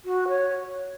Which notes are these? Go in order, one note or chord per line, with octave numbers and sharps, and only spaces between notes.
F#4
C#5